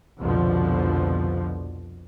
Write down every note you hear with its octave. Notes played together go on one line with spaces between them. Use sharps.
C2 F2 B2 D3 F3